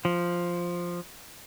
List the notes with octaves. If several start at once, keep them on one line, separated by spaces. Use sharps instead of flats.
F3